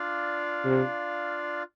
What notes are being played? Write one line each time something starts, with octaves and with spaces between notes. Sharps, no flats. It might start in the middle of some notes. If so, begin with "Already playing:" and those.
Already playing: D4 F4 D5 F5
C3